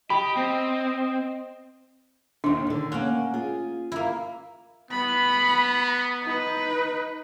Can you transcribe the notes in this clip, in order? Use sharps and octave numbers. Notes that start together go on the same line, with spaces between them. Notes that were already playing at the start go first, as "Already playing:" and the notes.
G4 D#5 B5
C4
D#2 D#3 D4
D3 D#3
A#3 C#4 F#5
F4 G#4
A#3 E4
B3 B5
D#4 B4